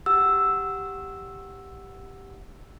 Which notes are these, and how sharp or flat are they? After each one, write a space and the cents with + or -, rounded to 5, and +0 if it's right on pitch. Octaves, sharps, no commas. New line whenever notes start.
G4 +0 F#5 +0 E6 +0